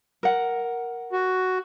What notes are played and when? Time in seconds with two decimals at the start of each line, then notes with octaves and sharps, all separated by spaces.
0.23 A#4 F#5
1.12 F#4